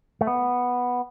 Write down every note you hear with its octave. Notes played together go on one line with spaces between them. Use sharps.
A3
B3